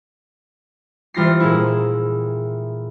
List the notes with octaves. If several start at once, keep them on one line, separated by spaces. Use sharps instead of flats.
E3 G3 F4 A#6 C7
A#2 G#3 E4